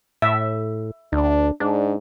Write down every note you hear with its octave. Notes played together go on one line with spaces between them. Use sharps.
A2 E5
D2 D4
G#2 D4